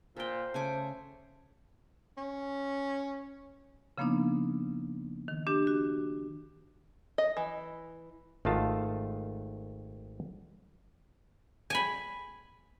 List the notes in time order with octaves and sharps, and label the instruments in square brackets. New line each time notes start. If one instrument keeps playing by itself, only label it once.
[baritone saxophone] A#2 [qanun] A4 G5 [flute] C5
[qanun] C#3 G#5 D6 [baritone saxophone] A3
[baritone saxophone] C#4
[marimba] C#3 F3 A#3 B3 D4 D#4
D#3
D4 G4
F#4
[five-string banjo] D#5
E3
[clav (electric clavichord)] G#1 D#3 A3 F4 A5
[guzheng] G#5 B5